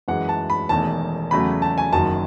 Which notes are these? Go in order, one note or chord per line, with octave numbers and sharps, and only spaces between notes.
F#2 E3 G#3 F#5
A5
B5
E1 E2 D#3 A3 A5
E2 C#3 F#3 A3 B5
A5
G#5
F#1 F#2 D#3 F#3 A5